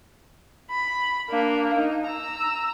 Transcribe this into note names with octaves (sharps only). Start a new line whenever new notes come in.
B5
A#3 D4
D#4
A#5 E6